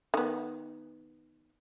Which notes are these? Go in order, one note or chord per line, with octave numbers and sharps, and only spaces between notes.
D#3 B3